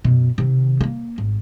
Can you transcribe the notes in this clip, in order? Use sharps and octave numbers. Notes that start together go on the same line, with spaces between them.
F#2 B2
C3 D#3
A3 A#3
G#1